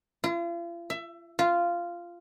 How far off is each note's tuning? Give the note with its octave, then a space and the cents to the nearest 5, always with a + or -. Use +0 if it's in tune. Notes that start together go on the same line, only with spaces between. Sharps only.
F4 -40
E5 +20
F4 -10